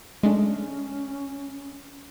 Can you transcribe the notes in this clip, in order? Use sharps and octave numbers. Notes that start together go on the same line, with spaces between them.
G#3 A3 C#4 D4